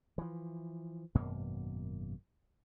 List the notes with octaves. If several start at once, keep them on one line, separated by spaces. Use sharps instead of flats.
E3 F3
G#1 F#2 B2 A#3